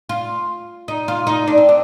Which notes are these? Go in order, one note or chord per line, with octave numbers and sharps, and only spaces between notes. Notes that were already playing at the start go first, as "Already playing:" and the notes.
F4
D#4
F4
D#4
D4
C4
D4